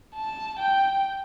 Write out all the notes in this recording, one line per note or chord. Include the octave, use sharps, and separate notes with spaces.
A5
G5